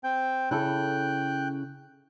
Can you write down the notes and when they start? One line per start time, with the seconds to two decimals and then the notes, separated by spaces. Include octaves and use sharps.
0.04 C4 G5
0.51 C#3 E4 A4 G5 F#6